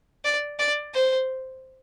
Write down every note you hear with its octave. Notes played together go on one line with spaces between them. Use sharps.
D5
D5
C5